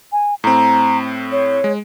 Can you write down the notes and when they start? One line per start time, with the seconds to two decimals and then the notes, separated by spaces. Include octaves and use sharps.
0.12 G#5
0.44 A2 C4 A#5
1.32 C#5
1.64 G#3